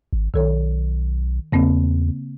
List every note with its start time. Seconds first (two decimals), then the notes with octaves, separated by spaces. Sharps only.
0.13 G#1
0.34 B1 D#3 A4 C#5
1.52 E2 C#3 A#3 C4